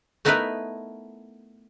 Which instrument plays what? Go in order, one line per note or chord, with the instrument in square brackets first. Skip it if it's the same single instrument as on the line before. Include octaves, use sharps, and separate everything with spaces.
[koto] A3 B3 D#4 E4 A#4 B4